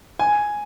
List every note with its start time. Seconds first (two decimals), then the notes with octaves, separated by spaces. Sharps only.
0.19 G#5